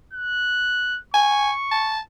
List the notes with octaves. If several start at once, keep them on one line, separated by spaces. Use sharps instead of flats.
F#6
G#5 C#6
A5